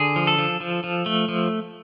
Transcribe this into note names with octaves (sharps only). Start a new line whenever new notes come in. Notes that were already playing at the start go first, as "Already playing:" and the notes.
Already playing: D3 G#4
F3
A4
F3
F3
F3
A3
F3